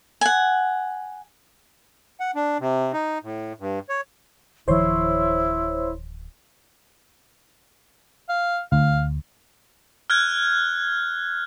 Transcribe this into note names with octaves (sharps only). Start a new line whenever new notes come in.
F#5 G#5
F#5
D4
C3
D#4
A2
G2
C#5
D1 D#3 F3 E4 C5 C#5 C6
F5
D2 F5
F6 F#6 G#6